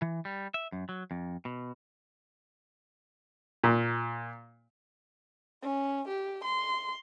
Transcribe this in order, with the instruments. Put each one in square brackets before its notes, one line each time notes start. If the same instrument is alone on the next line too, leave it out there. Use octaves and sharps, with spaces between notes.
[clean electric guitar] E3
G3
E5
F#2
F#3
F2
B2
[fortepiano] A#2
[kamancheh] C#4
G4
C6